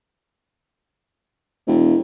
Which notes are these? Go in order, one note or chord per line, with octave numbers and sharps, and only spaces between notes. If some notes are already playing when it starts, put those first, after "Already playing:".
E1